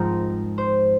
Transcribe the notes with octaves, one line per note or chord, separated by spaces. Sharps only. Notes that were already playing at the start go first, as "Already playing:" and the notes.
Already playing: G#2 F3 C4 D#4 A#4
C5